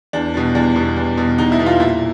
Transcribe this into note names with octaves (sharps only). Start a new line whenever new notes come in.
E2 D4
B2 G3
E2 D4
B2 G3
E2
B2 G3
E2 D#4
E4
B2 G3
F4
A#2 E4